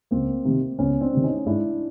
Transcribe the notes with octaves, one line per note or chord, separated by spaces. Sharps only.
C#2 A#3 C4
C3 D#3
C#2 B3 C#4
C4 D4
C3 D#3
C#4 D#4
D#4
G#2 D4 E4